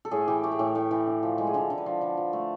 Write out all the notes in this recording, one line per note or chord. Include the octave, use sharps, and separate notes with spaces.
A4
A2 G#4
E3 G4
A3 G4
G#4
A2 G4
A2
E3
D3
F3
G#3
G#4
D3 A4
D3
B4
F3
D3 B4
F3
A3